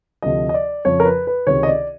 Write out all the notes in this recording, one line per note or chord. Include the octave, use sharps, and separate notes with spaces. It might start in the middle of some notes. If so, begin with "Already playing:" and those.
D2 C3 F3 D#5
D#5
D5
F2 C#3 F3 C#5
A#4
B4
B4
C#2 C3 D#3 C#5
D#5
D5